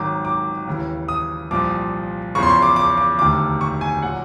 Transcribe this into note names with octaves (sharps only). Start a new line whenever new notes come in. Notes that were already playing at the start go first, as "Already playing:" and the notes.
Already playing: G#1 G#2 D#3 F#3 D6
D6
D#2 C#3 E3
D#6
C2 A#2 F3 D6
E2 C#3 F3 C#6
C6
C#6
D6
D6
D6
E1 D2 C3 D#3 D6
C#6
G#5
A#2 F#3 F#5